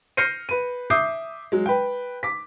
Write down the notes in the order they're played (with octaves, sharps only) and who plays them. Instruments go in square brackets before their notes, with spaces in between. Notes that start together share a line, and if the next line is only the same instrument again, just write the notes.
[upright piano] F6 G6 A#6 C7 C#7 D#7
B4 D#7
E5 D6 D#6 G6 C7
F#3 G#3
B4 G5
D6 B6